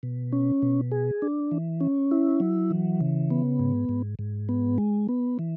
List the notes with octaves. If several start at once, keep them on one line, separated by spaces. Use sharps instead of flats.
B2
C#4
B2
G#4
D4
E3
C#4
E4
F#3
E3
C#3
B3
G#2
G#2
G#2
B3
G#3
B3
E3